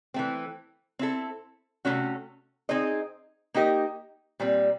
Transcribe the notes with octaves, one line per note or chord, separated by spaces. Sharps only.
E3 A3 C4
C4 E4 A4
C3 E3 A3 C#4 F#4
C4 D#4 G#4 C5 D#5
A#3 D#4 G4 A#4 D#5
A#2 G3 C4